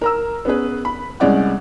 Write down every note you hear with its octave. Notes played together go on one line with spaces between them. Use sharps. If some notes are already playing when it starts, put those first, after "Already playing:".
A#4 A#5 E6
B3 C#4 G#4 B4
B5
C2 G#3 C#4 D5 F#5